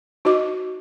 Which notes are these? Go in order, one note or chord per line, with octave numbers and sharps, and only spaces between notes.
D#4 F#4 D#5 D6